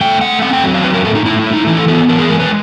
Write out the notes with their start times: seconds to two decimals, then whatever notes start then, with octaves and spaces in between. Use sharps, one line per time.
0.01 A3 G5
0.21 A3 F#5
0.42 C4 F#5
0.53 G5
0.63 F#3
0.74 F5
0.84 C4 B4
0.94 A#4
1.05 A2 A4
1.15 D#4
1.25 A3 E4
1.39 E4
1.46 A3
1.53 D#4
1.67 E3 E4
1.77 A4
1.88 B3 A4
2.09 E3 A#4
2.19 G#4
2.29 G#3 A#4
2.40 B4